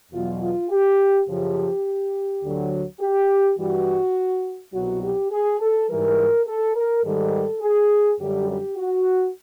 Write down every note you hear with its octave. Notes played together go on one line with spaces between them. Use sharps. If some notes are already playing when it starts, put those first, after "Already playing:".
E2 B2 F#3 F4
F4
G4
F#2 C#3 F3 G4
D2 D3 F#3
G4
G2 E3 G3 F#4
C2 B2 F#3 F#4
G4
G#4
A4
G#2 E3 G3 A#4
A4
A#4
G#2 D#3 G3 A4
G#4
F#2 D3 G3 G4
G4
F#4